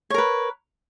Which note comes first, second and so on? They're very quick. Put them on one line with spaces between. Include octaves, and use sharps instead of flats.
C#5 A#4 B4